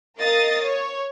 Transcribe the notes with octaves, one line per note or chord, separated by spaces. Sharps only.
A#4 D#5 F5 D#6 A6
C#5